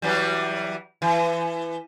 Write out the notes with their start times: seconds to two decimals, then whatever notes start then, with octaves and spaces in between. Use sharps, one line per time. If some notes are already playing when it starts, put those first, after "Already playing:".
0.02 E3 F#3 G3
1.02 E3